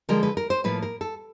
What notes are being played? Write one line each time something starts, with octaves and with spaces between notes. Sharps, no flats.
D3 F3 G#3 A#4
B4
A#4
C5
A2 F3 A#3 B4
A#4
A4